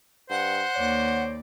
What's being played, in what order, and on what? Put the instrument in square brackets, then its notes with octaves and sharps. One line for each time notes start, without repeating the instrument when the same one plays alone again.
[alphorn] G2 [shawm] C5 [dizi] F#5
[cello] D#2 D5 [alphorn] C#5